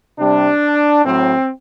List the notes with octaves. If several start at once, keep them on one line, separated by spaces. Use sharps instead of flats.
C3 G3 D4
A2 F#3 C4